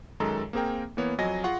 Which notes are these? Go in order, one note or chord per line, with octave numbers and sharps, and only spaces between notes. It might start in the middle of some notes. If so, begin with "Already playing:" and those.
F#2 D#3 G#3 A4 A#5
A#3 C4 G#4 A#4 G5
E3 A#3 B3 C#5
F2 F#3 D#5 G#5 A#6
F4 G#4 F5 F#5 C6 C#6